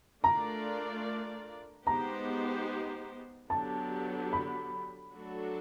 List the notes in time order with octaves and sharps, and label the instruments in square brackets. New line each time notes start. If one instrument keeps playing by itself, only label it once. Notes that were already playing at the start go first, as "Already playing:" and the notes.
[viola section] A3 D4 F4 A#4 D5 [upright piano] A#5
[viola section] G#3 B3 D#4 G4 C5 [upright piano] A#5
[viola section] D3 F#3 B3 D4 G4 [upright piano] A5
[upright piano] B5
[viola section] F#3 A3 D4 F#4 A4